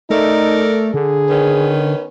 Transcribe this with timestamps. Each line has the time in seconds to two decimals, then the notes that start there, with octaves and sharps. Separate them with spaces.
0.10 A3 D#4 A4 A#4 D5
0.94 D3 G#4
1.29 D#3 B3 C#4